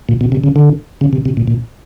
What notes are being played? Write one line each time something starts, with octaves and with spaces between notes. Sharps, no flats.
A#2
B2
C3
C#3
D3
C#3
C3
C3
A#2
A#2